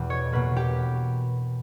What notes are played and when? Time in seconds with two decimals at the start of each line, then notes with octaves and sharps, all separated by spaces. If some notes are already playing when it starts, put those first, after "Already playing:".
Already playing: E2 B2 G4 B4
0.10 C#5
0.32 B2 A#3 B4
0.57 G4